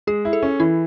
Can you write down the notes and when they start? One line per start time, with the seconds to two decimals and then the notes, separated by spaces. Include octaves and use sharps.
0.07 G#3 G#4
0.25 E4
0.33 A4
0.43 C#4
0.60 E3 E4